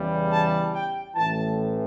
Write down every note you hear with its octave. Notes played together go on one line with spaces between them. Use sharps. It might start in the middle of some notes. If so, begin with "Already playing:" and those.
Already playing: E2 C#3 E3 G3
A5
G5
A1 A2 E3 A5